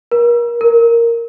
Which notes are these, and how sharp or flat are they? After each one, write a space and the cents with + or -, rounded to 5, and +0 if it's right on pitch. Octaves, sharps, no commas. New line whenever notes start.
A#4 +35
A#4 -5